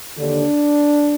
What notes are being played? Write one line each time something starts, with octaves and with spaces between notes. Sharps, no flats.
D#2 D3 D4